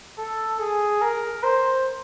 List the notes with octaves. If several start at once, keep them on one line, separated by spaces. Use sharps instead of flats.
A4
G#4
A#4
C5